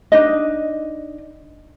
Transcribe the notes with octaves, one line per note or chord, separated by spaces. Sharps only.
D4 D#4 D#5